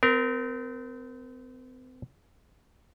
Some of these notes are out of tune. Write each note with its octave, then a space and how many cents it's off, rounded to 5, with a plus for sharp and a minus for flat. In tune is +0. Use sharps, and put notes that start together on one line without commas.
C4 -35 A#4 +0